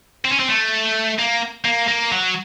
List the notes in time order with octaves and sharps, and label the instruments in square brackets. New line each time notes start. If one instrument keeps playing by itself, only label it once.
[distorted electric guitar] C4
C#4
C4
A3
A#3
A#3
A#3
F#3